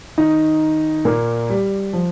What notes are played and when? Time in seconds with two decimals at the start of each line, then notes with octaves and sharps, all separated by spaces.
0.18 D#3 D#4
1.05 A#2 A#3
1.50 G3
1.93 F3